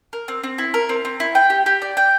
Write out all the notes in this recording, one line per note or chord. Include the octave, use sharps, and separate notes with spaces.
A#4
C4
C4
E4
A#4
C4
C4
E4
G5
G4
G4
D5
G5